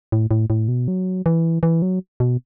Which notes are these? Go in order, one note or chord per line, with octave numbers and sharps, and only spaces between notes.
A2
A2
A2
B2
F#3
E3
E3
F#3
B2